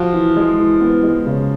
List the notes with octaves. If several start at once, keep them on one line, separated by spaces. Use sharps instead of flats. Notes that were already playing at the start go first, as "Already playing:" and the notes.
Already playing: F3 F4 F#4
E3
G#3
E3
B3
G#3
C#3